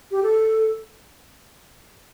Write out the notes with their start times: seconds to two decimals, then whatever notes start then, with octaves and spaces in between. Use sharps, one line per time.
0.11 G4
0.23 A4